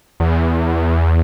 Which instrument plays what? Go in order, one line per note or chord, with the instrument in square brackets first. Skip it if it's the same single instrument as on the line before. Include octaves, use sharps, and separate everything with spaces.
[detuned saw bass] E2